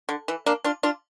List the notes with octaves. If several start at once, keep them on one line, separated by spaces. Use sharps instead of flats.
D3
E3
A#3 D4
D4 F4
D4 F4